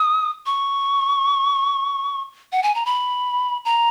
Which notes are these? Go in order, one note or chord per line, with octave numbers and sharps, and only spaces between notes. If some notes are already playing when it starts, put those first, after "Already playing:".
Already playing: D#6
C#6
F#5
G#5
A#5
B5
A#5